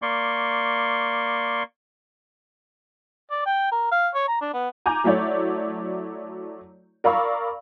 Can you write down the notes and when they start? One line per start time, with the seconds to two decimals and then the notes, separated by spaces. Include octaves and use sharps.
0.02 A#3 D5 C6 C#6
3.31 D5
3.46 G5
3.72 A#4
3.92 F5
4.15 C#5
4.28 A#5
4.41 D4
4.54 B3
4.86 G#5 A#5 D6 G6
5.04 F#3 A3 E4 C#5 D5
7.04 A#4 D5 F5 B5 C#6 E6